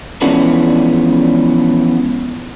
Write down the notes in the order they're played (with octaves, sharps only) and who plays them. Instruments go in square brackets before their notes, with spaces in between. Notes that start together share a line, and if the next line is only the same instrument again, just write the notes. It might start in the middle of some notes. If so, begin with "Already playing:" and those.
[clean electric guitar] E3 F3 G#3 B3 C#4 D4